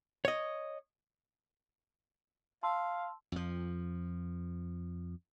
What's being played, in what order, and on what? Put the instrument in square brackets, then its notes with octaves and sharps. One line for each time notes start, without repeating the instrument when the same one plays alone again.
[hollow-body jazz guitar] C#5 D#5
[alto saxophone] F5 [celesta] A5 C6 E6
[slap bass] F2 F3